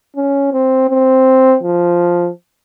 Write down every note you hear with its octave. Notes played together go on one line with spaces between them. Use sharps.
C#4
C4
C4
F3